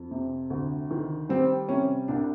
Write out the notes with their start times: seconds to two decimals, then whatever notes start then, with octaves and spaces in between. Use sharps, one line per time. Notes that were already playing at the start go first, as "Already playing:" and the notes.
Already playing: F2
0.11 C3
0.50 D2
0.91 D#3
1.29 G3 C4
1.69 C3 C#4
2.08 C2 D4